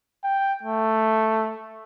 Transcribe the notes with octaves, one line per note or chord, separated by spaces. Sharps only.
G5
A3